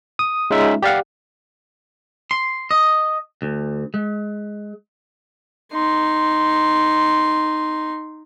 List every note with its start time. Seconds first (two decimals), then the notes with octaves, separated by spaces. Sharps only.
0.19 D#6
0.51 G#3 C#4 D#4 F4 E5
0.83 G4 D5 F5 F#5
2.31 C6
2.71 D#5
3.42 D2
3.94 G#3
5.73 D#4 C6